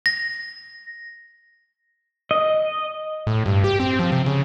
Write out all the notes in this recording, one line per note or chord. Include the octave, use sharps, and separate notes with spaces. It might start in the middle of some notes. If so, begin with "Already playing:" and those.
A#6
D#5
A2
G2
G4
C4
F3
C3
C#3